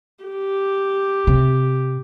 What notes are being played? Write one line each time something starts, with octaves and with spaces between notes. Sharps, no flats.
G4
C3